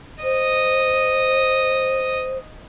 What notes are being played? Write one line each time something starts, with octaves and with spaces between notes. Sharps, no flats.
C5 D#5